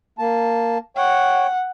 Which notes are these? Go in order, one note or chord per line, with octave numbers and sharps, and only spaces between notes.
A#3 A5
C#5 F#5 G5